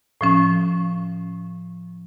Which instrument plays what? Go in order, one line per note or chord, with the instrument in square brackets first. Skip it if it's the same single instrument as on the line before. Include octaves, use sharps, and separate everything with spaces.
[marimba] A2 F3 C#4